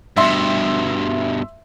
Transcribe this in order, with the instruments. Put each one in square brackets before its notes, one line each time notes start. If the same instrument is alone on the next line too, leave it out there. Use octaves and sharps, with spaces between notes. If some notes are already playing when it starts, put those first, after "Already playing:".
[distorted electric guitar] G2 B2 [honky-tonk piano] E5 C6